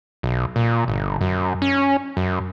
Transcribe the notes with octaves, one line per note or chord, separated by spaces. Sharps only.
B1
A#2
G1
F#2
C#4
F#2